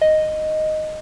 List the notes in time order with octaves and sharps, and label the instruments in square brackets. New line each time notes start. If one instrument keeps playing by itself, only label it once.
[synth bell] D#5